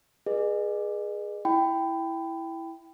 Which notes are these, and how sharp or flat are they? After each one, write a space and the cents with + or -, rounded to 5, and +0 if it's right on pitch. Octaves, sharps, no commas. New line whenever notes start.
G#4 +0 B4 -30 D#5 -40
E4 +0 G5 +0 B5 +25